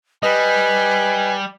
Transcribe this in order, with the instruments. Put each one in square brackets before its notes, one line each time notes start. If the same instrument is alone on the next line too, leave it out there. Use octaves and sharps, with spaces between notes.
[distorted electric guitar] G3 [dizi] B4 [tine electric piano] D#5 [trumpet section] G#5